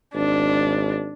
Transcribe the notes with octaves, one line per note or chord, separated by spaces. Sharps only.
G#1 D4